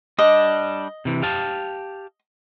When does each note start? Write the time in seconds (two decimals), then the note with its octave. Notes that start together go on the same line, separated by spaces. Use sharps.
0.19 G3 D4 D#5
1.05 C3 E3
1.22 G4 F5 A5